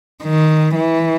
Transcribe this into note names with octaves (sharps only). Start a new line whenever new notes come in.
D#3
E3